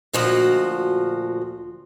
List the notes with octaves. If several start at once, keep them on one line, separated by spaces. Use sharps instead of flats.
D2 A#2 F3 F#4 D#5